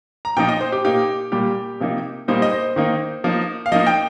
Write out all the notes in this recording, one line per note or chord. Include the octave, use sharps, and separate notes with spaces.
A#5
A#2 F3 D#4 G5
D#5
C5
G4
A#2 A#3 D#4 G4
A#2 G3 A#3 G4
C3 F3 A#3 D#4
A#2 G3 A#3 D#4 C5
D#5
C5
D#3 A#3 D#4
F3 A#3 D#4
F5
F3 A#3 D#4 D#5
G5